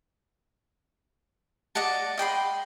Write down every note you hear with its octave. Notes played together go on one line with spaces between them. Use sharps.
D5 D#5 F#5 A5
D#5 G5 B5 C6